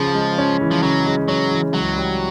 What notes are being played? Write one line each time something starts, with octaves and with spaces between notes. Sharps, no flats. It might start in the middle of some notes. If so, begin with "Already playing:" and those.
Already playing: C#3 F3
G#3
C#4
E3
F3
C#3 F#3
G#3
F#3 C#4
E3
C#2 F#3
G3